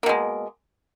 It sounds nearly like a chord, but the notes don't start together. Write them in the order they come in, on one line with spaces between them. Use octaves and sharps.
A#3 B2 G#3